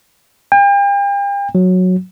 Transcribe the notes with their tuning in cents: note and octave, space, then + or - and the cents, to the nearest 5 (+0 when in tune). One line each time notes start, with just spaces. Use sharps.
G5 +40
F#3 -10